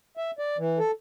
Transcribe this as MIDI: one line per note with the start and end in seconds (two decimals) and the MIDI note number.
0.17 0.31 76
0.39 0.57 74
0.58 0.79 52
0.79 0.91 69